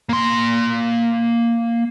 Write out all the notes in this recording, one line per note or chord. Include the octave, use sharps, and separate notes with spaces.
A#3 C6